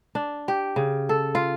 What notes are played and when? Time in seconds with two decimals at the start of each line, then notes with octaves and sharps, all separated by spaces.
0.15 D4
0.48 G4
0.76 C#3
1.09 A4
1.35 F4